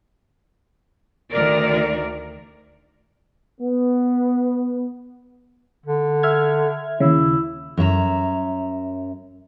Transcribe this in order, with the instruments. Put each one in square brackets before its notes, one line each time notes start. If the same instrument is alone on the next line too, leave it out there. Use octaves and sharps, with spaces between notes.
[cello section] D2 D#3 A#4 D5
[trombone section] B3
[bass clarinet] D3
[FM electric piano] E5 F6 G#6
[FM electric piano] D#2 C#3 [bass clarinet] E4
[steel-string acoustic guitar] F#2 C#5 E5 A#5